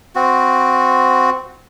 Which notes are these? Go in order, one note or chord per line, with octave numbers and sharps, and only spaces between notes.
C4 F#4